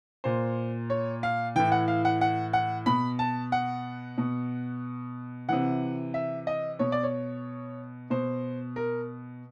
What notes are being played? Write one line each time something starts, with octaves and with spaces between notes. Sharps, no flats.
A#2 C5
C#5
F5
A2 E3 G5
F#5
F5
F#5
F#5
F#5
B2 B5
A5
F#5
B2
C3 E3 F#5
E5
D#5
B2 C#5
D5
C#5
B2 C5
A#4